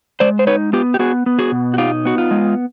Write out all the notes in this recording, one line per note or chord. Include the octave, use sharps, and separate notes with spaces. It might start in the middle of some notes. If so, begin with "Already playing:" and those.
G#3 C5 D5
C5
D#4 B4 C#5
B3 F4 G4
G4
B3 F#4 G#4
B3
F#4 G#4
B2
F#4
D#4 F4 G4
B3 F#4
F4
G#3